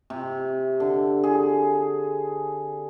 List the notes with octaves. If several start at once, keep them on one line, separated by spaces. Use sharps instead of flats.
C3
D3
G#4